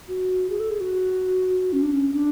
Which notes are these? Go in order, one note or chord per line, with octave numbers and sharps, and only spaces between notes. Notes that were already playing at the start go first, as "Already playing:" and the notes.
F#4
G#4
A4
G#4
F#4
C#4
D4
C#4
D4